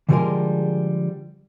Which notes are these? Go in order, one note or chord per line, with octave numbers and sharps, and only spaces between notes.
D3 F3 G3 G#3 G#4 A#4